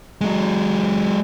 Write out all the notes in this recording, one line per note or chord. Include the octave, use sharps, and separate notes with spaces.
F#3 G#3